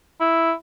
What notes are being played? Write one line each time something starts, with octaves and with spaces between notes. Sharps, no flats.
E4